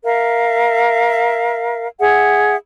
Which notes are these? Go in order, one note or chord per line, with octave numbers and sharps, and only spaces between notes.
A#4 E5 F5
G#4 E5 F#5